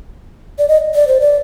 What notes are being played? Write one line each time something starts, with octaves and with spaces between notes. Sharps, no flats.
D5
D#5
D5
C5
D5